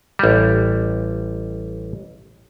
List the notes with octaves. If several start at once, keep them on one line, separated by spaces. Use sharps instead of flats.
A1 G3